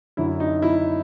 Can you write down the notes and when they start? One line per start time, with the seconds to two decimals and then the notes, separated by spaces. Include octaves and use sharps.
0.17 F#2 D3 E4
0.40 D#4
0.62 E4